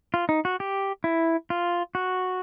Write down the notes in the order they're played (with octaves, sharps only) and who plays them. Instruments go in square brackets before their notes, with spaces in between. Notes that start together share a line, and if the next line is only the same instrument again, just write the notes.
[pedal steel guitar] F4
D#4
F#4
G4
E4
F4
F#4